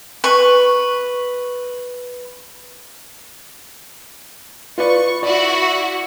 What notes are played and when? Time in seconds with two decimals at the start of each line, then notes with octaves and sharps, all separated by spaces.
0.24 B4 C#6
4.78 F4 B4 D5 C#6
5.23 E4 F#4 D5